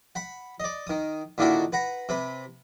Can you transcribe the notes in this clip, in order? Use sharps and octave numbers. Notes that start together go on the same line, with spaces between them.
F#5 B5
D5 D#5
D#3 D#6
A#2 D3 D#3 D4 E4 F#4
B4 F#5 A#5
C3 B4 B5